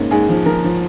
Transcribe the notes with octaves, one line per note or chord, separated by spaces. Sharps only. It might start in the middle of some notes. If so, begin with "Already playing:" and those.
Already playing: G#2 A#3 C#4
G#2 G#4
F3
F3 A#4
F3